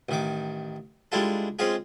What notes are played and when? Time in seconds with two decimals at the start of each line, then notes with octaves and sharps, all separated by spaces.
0.09 A1 D#3 D6
1.12 G3 G#3 D4 E4 F4 A4
1.59 G#3 C4 C#4 F4 G#4